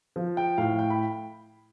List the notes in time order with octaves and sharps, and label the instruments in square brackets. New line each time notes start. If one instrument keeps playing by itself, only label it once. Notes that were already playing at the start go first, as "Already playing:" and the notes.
[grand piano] F3
G5
A2 F5
G5
B5